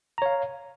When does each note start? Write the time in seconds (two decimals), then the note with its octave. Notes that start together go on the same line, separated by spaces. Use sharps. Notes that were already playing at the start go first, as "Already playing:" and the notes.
0.18 A#5
0.22 C#5
0.26 F5